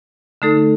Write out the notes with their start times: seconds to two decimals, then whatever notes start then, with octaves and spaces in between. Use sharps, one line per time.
0.42 D3 A3 D#4 A4